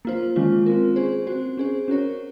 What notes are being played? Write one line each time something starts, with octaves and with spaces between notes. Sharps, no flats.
A#3 F4 C5
D#3 G#3 C#4 F4
C4 F4 A#4
C#4 G#4 C5
C4 F#4 C5
C#4 G#4 C5
C#4 F#4 A#4 C#5